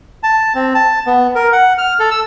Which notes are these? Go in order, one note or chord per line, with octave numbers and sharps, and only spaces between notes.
A5
C4
A5
B3
A#4
F#5
F6
A4
E6